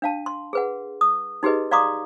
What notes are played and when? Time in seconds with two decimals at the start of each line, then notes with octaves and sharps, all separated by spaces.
0.02 D4 F5 A5
0.26 C6
0.53 G#4 B4 F#5
1.01 D#6
1.43 D#4 G4 G#4 B4 D#5
1.71 D5 F5 A#5 C6 D6 D#6